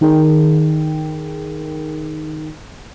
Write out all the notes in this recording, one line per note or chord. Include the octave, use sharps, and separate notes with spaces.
D#3 D#4 G#4 A#4 G5